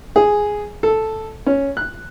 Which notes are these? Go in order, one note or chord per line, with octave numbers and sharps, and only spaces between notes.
G#4
A4
C#4
F#6